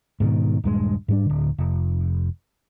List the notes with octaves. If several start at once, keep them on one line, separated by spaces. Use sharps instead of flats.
G#2 B2 D3 D#3
D#1 G2 G#3
G#2 G3 D4
D1 D3
F1